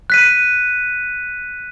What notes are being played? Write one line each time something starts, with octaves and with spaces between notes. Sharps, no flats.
F#6 B6 D#7